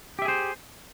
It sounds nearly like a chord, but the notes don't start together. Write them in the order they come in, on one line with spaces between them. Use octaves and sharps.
G4 E5 G#4 C5